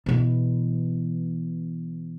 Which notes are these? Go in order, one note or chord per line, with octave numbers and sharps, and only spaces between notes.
B2 E3